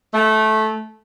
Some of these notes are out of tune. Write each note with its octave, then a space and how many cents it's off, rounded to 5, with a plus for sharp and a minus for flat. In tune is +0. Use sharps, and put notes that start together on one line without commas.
A3 -15